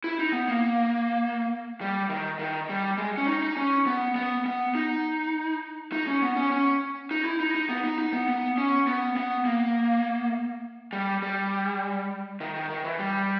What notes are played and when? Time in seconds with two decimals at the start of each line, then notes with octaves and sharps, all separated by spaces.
0.04 E4
0.19 D#4
0.33 B3
0.48 A#3
1.81 G3
2.09 D#3
2.39 D#3
2.69 G3
2.98 G#3
3.18 C#4
3.28 D#4
3.43 D#4
3.57 C#4
3.87 B3
4.16 B3
4.46 B3
4.75 D#4
5.92 D#4
6.07 C#4
6.22 B3
6.36 C#4
6.51 C#4
7.11 D#4
7.25 E4
7.40 D#4
7.54 D#4
7.69 B3
7.84 D#4
7.98 D#4
8.13 B3
8.28 B3
8.58 C#4
8.87 B3
9.17 B3
9.46 A#3
10.93 G3
11.22 G3
12.40 D#3
12.55 D#3
12.70 D#3
12.84 E3
12.99 G3